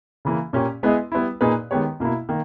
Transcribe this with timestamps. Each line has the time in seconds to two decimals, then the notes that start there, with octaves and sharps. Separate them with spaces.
0.25 C#3 E3 A#3
0.53 A#2 A#3 C#4 G4
0.83 G#3 B3 E4 G#4 D#5
1.12 G3 B3 E4
1.41 A#2 A#3 D#4 G#4 B4
1.71 D#3 G#3 B3 G4 C#5
2.00 B2 A#3 E4
2.29 D#3 A#3